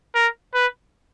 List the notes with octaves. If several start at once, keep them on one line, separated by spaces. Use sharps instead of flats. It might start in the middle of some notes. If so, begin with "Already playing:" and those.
A#4
B4